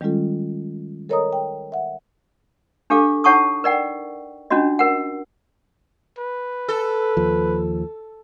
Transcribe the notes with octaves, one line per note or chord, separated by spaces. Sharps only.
D#3 G3 G#3 C#4 F4 A4
A4 A#4 C#5 D#5 A#5 D#6
G5
E5 F#5
D4 G4 A4 F5 D6
D#4 C#5 F#5 A5 C#6 D#6
A#4 D5 F#5 G5
C#4 D4 F4 F#4 D#5
A#4 F#5
B4
A4
D#2 F3